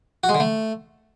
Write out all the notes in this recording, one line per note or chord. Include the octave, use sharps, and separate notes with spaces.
F#4
G#3
D3
A3